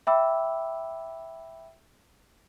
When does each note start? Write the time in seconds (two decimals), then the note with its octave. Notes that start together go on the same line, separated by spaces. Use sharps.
0.07 E5 G5 B5 D6 E6